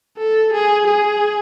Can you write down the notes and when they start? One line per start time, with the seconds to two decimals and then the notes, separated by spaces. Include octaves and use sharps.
0.18 A4
0.53 G#4
0.87 G#4